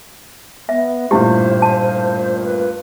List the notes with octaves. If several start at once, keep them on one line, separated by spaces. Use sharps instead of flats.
B3 E5
A1 G2 A#2 E4 G4 C5
A5
B4